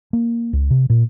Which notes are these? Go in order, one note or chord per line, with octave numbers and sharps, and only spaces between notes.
A#3
C#2
C3
A#2